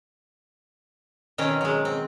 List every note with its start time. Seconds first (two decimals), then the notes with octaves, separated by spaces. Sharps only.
1.38 B2 D#3 C4 C#4 D#5
1.61 F#3 G#3
1.85 C4